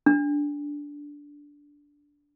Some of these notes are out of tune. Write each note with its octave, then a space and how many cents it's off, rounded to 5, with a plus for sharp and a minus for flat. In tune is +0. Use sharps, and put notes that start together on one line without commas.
D4 -10